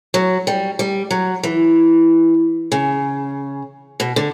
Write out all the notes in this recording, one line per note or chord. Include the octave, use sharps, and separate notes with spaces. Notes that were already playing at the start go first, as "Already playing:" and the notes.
F#3
G3
G3
F#3
E3
C#3
B2
D3